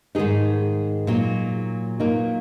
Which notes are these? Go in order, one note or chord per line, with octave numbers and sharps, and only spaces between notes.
G#2 D#3 G#3 D#4 G#4
A#2 F#3
A#2 F#3 A#3 D#4